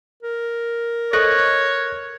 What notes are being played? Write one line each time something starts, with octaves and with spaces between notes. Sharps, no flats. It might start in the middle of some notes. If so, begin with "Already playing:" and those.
A#4
A4 C5 C#5 D#5 C#6 F#6 A#6